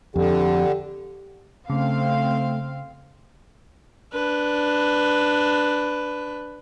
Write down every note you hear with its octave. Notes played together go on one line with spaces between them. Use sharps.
F2 D3 G4
C#3 A3 C4 F5
D4 B4